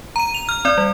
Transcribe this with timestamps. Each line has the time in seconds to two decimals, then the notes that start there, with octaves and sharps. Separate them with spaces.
0.16 A#5 D#7
0.34 F7
0.49 F6
0.65 C4 D5
0.78 G3